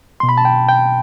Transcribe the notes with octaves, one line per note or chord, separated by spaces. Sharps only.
B2 C6
B5
A5
G5
G5